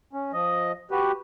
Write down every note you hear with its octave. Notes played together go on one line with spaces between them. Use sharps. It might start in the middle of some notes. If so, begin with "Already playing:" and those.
C#4
F3 D#5
F#4 G4 B4